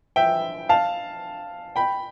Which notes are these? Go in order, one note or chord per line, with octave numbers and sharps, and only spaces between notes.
E5 G5
F5 A5
G5 B5